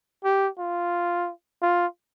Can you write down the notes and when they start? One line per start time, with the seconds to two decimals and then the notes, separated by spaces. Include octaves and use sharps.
0.25 G4
0.59 F4
1.62 F4